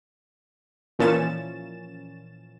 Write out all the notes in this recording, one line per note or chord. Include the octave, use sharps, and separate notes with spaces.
A#2 E3 F3 C#4 A6 E7